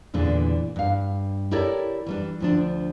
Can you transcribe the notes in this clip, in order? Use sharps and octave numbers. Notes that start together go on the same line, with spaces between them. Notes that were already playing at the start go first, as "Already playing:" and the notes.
E2 A#2 D3 E3 D4
G2 F5
E4 G4 A4 A#4 C#5 D5
E3 G3 D4
D2 F3 D4